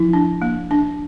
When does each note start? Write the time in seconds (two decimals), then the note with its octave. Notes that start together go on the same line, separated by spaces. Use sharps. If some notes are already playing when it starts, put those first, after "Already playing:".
Already playing: F3 E4
0.13 D4
0.42 A#3
0.71 D4